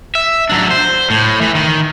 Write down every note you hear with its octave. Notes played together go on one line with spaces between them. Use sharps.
E5
F#3 D4
C5
A2
E3
D#3